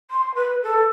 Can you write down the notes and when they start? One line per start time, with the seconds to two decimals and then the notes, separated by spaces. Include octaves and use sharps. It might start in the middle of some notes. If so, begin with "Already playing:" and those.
0.11 C6
0.35 B4
0.63 A4